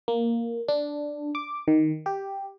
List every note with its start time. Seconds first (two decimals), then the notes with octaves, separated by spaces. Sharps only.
0.08 A#3
0.68 D4
1.35 D6
1.68 D#3
2.06 G4